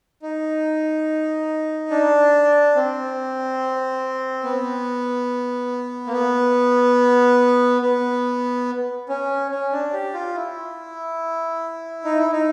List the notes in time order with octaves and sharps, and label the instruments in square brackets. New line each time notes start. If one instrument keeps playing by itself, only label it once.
[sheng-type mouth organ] D#4
D4
C4
B3
A#3
B3
B3
C#4
C#4
D4
G4
F4
E4
D#4
E4
D#4